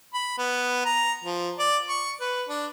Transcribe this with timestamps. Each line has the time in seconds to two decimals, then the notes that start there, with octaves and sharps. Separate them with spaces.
0.14 B5
0.38 B3
0.85 A#5
1.24 F3
1.59 D5
1.89 C#6
2.21 B4
2.49 D4